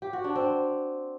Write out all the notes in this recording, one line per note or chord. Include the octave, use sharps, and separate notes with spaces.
G4
F#4
D4
C4